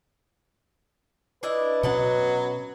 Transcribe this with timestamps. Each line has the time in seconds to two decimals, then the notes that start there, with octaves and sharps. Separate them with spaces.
1.43 D4 E4 B4 D#5
1.83 B2 F#3 C#4 D#5 F#5 A5